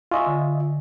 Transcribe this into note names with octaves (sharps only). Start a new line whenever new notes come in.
F4 D#5 E5 G#5 C#6
D3